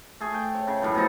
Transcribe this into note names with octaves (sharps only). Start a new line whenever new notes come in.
A3 G#4
G5
C#5
C#3
F#2 A2 E3
B2 F3 D#4 A4